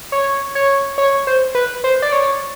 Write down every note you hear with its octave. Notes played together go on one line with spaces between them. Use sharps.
C#5
C#5
C#5
C5
B4
C5
D5
C#5